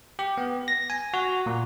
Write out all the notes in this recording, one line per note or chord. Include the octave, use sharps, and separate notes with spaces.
G4
B3
A#6
G#5
F#4
A#2